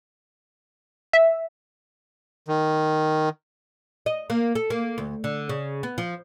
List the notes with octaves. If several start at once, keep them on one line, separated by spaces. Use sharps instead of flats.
E5
D#3
D#5
A#3
A4
A#3
D2
D3
C#3
B3
F3